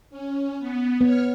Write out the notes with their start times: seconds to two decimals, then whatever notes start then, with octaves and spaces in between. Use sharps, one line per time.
0.11 C#4
0.59 B3
1.01 B3 C#5 F6